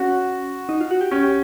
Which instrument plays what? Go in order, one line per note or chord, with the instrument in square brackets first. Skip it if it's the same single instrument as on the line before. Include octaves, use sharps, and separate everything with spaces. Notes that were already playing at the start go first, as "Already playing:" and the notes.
Already playing: [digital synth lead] C#4 [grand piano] F#4
[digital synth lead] D#4
F4
F#4
G4
[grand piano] C#4 [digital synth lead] G4
[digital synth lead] G4